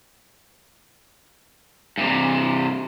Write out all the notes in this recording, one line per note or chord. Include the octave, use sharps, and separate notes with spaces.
G2 C3